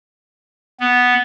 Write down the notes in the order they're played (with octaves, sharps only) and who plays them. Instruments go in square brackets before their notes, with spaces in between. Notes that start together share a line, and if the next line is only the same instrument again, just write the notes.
[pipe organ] B3